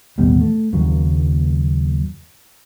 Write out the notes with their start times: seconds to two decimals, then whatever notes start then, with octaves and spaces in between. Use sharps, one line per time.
0.18 A1 D#2 B2 G3
0.41 A3
0.73 F#1 D#2 C#3 F#3